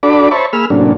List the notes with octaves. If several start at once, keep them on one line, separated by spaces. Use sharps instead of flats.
D4 F#4 A4 D5 B5 D6
C5 C#5 E5 A5 B5 C#6
A#3 G#4 B5 E6 F6
A2 C3 F#3 A#3 C#4 D4